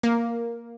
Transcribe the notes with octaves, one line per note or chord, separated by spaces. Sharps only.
A#3